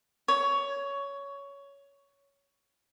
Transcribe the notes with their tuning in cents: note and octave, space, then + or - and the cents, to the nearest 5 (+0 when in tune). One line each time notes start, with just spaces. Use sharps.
C#5 +15